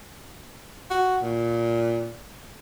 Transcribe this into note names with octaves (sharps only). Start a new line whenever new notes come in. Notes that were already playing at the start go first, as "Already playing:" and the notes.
F#4
A#2